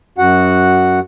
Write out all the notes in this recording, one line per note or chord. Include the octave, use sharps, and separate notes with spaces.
F#2 F#4 F#5